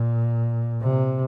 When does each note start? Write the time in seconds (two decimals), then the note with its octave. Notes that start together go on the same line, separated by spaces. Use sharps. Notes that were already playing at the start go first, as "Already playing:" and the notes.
Already playing: A#2
0.82 C3